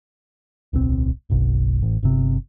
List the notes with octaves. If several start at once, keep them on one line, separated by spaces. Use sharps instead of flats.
D1 B1 C4
F#1 B1
A1
G1 C3